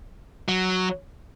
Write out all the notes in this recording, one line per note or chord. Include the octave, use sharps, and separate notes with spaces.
F#3